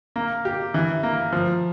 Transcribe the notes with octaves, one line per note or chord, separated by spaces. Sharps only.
A#3
G4
E3
A#3
F3